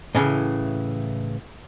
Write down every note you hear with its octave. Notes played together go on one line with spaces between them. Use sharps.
A2 C#3 E3